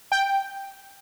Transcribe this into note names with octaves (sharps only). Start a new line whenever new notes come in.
G5